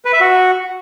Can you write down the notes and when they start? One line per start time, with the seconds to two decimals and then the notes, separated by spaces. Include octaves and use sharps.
0.05 B4
0.13 E5
0.21 F#4